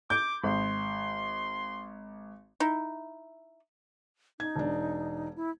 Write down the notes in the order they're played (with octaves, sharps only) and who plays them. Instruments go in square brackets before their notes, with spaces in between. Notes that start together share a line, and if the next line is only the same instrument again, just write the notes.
[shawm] D6 [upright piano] G6
[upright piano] G#1 [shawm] C6
[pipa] D#4 E4
[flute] D#4 [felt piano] G#6
[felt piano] E1 D4
[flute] E4